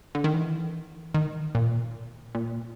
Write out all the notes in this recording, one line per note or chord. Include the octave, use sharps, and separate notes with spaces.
D3
D#3
E3
D#3
A#2
A#2